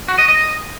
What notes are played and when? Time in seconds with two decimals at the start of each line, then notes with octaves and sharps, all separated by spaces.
0.08 F#4
0.18 D#5
0.28 D#5